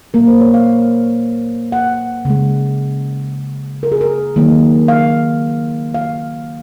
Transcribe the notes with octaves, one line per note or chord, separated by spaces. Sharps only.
A#2 F#3 A#3 A#4
C5
C#5
F5
F#5
C#3 G#3
A#4
G#4
A#4
D#3 F#3 A#3
F5
F5